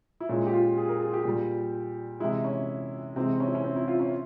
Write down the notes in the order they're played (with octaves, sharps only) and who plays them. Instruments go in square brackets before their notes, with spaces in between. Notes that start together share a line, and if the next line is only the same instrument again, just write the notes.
[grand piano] E4
A#2 G#3 C#4
G4
F4
G#4
A#4
G#4
G4
A#2 G3
C3 E3 G#3 E4
C#4
C3 E3 G#3 C4
C#4
E4
C#4
C4
E4
F4
C#4